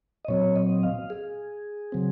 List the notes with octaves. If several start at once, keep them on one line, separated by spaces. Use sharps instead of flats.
D#5
A#2 F#3 C4 C#5
D#5
F5
G#4
C#3 F#3 C4